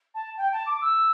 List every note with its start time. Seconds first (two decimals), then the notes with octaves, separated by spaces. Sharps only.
0.14 A5
0.37 G5
0.52 A5
0.66 D6
0.81 E6